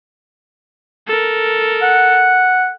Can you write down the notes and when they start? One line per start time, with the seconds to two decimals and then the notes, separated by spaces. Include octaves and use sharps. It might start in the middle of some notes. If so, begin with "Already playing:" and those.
1.08 A4 A#4
1.82 F#5